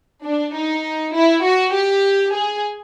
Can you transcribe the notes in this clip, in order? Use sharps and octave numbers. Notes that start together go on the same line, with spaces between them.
D4
D#4
E4
F#4
G4
G#4